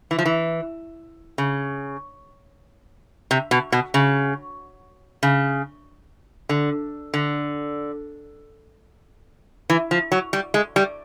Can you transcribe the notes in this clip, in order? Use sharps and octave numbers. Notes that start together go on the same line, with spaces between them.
E3
F3
E3
C#3
C3
B2
B2
C#3
C#3
D3
D3
E3
F3
F#3
G3
G#3
G3